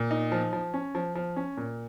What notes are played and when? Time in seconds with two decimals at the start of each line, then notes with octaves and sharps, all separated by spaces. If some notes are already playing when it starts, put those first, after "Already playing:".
Already playing: A#2
0.11 D#4
0.32 F3
0.53 F3
0.74 C#4
0.95 F3
1.15 F3
1.36 C#4
1.57 A#2